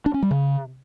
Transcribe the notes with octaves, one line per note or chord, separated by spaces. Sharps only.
D4
C#4
G3
C#3